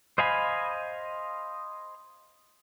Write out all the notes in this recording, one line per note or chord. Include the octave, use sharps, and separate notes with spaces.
C5 D#5 F5 G#5 B5